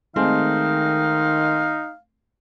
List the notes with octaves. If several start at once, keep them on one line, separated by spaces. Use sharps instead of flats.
D#3 G#3 A3 C4 D#4 F5